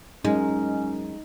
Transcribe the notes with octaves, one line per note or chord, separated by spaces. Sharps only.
F#2 G#3 C#4 D#4